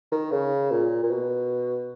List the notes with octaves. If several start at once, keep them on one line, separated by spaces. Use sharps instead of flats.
D#3
C#3
A#2
A#2
B2